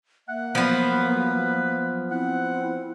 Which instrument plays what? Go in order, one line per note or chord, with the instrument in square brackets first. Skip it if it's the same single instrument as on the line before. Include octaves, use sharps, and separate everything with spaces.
[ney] A#3 [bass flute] E5 [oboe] F#5
[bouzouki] F3 B3 [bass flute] F#3
[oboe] B4
[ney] C4 [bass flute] E4 [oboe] F#5